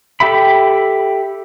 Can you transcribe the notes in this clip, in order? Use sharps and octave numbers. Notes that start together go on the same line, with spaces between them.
G4 A4 E5 B5